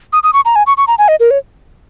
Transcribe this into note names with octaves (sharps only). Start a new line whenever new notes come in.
D#6
D#6
C#6
A#5
G#5
C#6
C#6
A#5
G#5
D#5
A#4
C#5